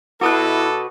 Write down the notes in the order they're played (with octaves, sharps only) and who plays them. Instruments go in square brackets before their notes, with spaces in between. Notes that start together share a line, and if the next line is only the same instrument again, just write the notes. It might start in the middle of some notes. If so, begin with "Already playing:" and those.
[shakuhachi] E4 [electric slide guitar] F#4 B4 [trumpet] A4 [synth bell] D6 D#6 F#6